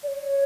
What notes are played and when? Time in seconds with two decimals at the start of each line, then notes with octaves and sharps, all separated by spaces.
0.03 D5
0.08 C#5